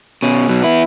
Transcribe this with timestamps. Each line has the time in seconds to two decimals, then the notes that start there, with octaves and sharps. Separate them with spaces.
0.22 B2 C#4
0.49 B2 F#3
0.62 B3 E4